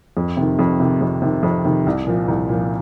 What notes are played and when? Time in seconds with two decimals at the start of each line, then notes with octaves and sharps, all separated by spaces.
0.17 F2
0.37 C3 D#3
0.59 F2
0.80 C3 D#3
1.01 F2
1.22 C3 D#3
1.43 F2
1.64 C3 D#3
1.86 C2
2.07 A#2 F3
2.28 C2
2.49 A#2 F3